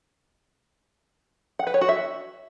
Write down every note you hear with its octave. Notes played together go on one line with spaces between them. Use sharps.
F#5
B4
C#5
F#4
E5